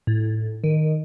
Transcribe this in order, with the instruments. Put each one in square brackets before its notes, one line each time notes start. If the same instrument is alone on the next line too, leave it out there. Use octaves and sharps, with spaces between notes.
[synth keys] A2
D#3